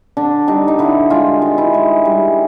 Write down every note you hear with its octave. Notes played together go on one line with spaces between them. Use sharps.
D3 D4
G3 D#4
D#4
D3 E4
G#3 F4
D#3
E4
G#3
G3